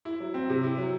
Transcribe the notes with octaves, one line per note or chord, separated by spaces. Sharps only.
E4
F#3
C4
C3
E4
F#3